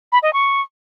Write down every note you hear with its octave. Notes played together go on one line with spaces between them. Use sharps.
B5
D#5
C#6